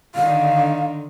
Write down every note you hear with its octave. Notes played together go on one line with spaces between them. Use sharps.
D3 D#3 F5